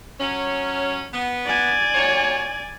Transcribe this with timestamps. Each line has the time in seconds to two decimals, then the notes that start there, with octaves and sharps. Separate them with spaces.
0.20 F#3 C#4
1.13 B3
1.46 D5 G#5
1.94 D#2 F#3 C#5